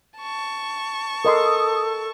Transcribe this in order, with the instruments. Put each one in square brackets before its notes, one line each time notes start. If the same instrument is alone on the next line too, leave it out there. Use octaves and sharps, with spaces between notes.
[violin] A5 C#6
[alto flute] A4 [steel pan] A#4 D#5 C6 [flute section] D#6